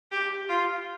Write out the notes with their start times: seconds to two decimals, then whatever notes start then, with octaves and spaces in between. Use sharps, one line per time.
0.12 G4
0.48 F4